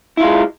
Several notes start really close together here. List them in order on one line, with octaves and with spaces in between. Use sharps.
E4 F4 G#3